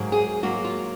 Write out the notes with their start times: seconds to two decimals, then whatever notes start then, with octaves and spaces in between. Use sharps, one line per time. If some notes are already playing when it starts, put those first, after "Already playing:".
Already playing: G#2 F#3 A#3
0.12 G#4
0.43 G#2 F#3 A#3 F#4
0.64 F4